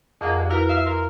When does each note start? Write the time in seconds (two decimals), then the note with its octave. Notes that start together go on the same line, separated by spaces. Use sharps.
0.21 F2 G#3 A#3 F#5
0.36 G2
0.50 E4 F#4 A#4 B4
0.69 E5 F5
0.86 A#4 C6